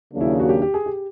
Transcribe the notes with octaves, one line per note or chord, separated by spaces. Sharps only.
D#2 C#3 F#3 A#3 D4
E4
F#4
G4
G4
G#4
G4